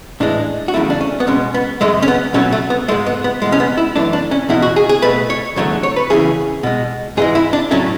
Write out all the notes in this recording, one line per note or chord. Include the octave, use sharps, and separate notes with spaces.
A2 E3 G#3 D4
F#4
E2 C#3 F#3 A3 E4
D4
C#4
B3
B2 G#3 C#4
B3
F#2 C#3 G#3 A3
C#4
B3
B2 F#3 A3 C#4
A3
B3
G#2 G#3 A3
B3
B3
E2 B2 G#3
C#4
B3
E4
F#2 E3 A3 D4
D4
C#4
E2 B2 G#3 E4
F#4
G#4
G#4
B2 A3 B4
C#5
E2 D3 F#3 A3 C#5
C#5
B4
E2 C#3 E3 G#4
B2 G#3
G#2 E3 G#3 G#4
E4
D4
A2 F#3 A3 C#4